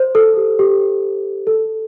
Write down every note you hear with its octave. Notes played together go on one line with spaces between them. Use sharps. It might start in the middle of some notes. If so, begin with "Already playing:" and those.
Already playing: C5
A4
G4
G4
A4